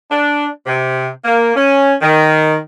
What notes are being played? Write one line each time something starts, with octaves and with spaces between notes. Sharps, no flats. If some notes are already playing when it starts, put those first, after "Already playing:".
D4
C3
A#3
C#4
D#3